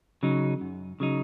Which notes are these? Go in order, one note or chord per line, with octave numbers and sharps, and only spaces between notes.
C#3 F#3 D#4
F#2
C#3 F#3 D#4